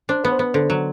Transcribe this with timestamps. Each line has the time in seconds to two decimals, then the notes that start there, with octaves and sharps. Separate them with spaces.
0.09 D4 C5
0.24 B3 B4
0.32 C5
0.39 B3 B4
0.54 D3 C5
0.70 F#3